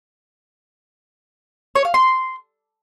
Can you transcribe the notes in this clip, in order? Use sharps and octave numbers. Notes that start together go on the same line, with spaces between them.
C#5
F5
C6